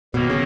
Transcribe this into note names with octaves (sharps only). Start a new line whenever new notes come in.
B2 D#3 F#3 A#3
C#3